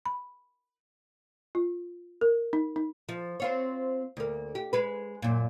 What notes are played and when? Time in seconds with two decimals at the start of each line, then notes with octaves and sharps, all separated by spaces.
0.06 B5
1.55 F4
2.21 A#4
2.53 D#4
2.76 D#4
3.09 F3
3.40 C4 F4 C#5
4.17 D2 A#3
4.55 G4
4.73 G#3 B4
5.22 F#2 A#2